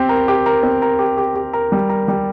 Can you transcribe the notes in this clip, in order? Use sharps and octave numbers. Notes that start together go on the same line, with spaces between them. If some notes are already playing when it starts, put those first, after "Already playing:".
Already playing: C4 G4
A#4
G4
A#4
C4
A#4
G4
G4
G4
A#4
G3
A#4
G3